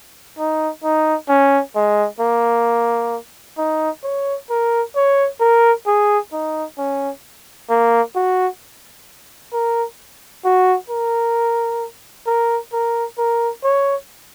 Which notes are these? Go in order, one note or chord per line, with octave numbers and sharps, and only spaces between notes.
D#4
D#4
C#4
G#3
A#3
D#4
C#5
A#4
C#5
A#4
G#4
D#4
C#4
A#3
F#4
A#4
F#4
A#4
A#4
A#4
A#4
C#5